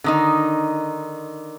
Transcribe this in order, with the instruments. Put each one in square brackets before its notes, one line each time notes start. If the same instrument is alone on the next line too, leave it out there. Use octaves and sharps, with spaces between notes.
[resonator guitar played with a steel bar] D3 D#3 D#4